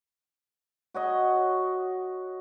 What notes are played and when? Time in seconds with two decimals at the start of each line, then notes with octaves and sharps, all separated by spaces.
0.94 F#4 C#5 D#5